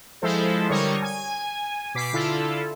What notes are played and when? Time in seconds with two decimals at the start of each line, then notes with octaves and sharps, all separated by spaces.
0.22 F3 G#3 E4 A4 C5
0.69 D3 G3 A#4 C#5 C#6 D#6
1.02 G#5
1.95 B2 D6 B6 C7
2.13 D3 E4 F4 A4